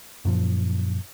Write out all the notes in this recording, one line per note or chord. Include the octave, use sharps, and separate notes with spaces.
F#2 A#2 F3